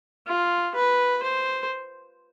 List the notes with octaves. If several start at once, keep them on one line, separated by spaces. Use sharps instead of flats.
F4
B4
C5